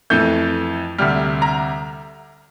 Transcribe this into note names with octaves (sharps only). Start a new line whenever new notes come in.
F2 E3 A3 G6
D2 C3 G3 F6
A#5